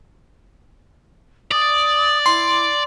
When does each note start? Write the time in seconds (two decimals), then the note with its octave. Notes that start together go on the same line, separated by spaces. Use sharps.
1.52 D5 D#6
2.26 E4 C6